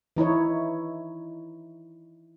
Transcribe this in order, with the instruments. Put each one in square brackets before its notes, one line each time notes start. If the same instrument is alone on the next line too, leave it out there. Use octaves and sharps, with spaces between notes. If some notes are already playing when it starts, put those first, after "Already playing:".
[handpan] E3 D#4 E4 C#5